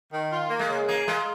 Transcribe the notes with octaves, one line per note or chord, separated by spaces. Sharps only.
D#3
F4
A#3
G#3
C#3
A#3 G#4
G#3 F4